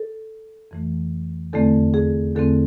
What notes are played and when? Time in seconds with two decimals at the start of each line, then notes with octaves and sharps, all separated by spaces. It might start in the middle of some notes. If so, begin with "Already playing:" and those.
Already playing: A4
0.71 F2 E3 A3
1.53 E2 D3 A3 C4 A4
1.94 G#4
2.36 E2 D3 A3 C4 A4